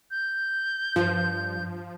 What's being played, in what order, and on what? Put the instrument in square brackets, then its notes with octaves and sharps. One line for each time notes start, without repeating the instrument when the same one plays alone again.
[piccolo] G6
[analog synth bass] G2 [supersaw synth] F3